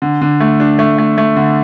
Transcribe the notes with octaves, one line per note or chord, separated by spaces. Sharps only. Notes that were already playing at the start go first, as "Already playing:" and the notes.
D3
D3
A3
D4
A3
A3
A3
D3